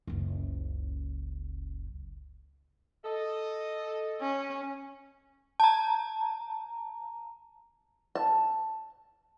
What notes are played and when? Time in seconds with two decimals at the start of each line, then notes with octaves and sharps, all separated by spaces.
0.07 F#1 C#2
3.04 A4 D#5
4.21 C#4
5.60 A5 A#5
8.15 A5